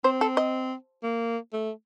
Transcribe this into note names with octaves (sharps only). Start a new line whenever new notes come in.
C4 C5
A4
D#5
A#3
A3